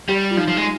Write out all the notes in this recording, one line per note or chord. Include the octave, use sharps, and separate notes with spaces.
G3 G4
F4
F3 D#4
F3
G#3